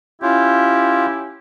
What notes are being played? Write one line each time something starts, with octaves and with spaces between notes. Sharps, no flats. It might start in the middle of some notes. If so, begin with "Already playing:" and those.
C#4 E4 F4 G4